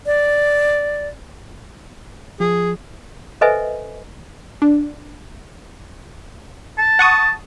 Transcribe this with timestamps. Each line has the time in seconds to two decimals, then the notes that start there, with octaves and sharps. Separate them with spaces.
0.06 D5
2.40 F3 G#4
3.41 A4 B4 C5 D#5 E5 G#5
4.62 D4
6.78 A5
6.99 F#5 C#6 D#6